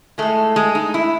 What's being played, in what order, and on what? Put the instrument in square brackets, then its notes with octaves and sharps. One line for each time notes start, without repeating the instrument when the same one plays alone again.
[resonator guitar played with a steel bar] A2 G#3 A3
G#3
D#4
E4